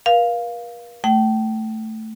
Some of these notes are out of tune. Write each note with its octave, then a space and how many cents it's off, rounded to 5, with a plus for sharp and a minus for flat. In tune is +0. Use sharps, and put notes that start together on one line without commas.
A#4 +45 F5 +0
A3 +0 G5 -30